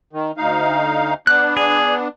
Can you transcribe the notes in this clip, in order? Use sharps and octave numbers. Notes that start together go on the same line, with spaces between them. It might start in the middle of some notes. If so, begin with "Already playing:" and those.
D#3
D2 D#4 F5
B3 D4 F#6
G#4